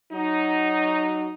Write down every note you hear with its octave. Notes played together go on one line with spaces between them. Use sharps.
F#3 D#4